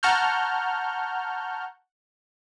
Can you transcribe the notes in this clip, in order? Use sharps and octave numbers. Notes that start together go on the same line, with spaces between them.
F#5 A5 A#5 C#6 F6 G6